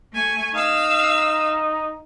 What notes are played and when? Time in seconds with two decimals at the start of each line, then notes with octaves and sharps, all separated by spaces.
0.14 A3 G#5 C#6
0.55 D#4 F5 E6